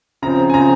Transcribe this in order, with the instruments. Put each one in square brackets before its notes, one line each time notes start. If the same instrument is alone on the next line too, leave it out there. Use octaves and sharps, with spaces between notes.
[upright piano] C#3 F3 C4 A#5
G#5
C#3 F3 C4 A#5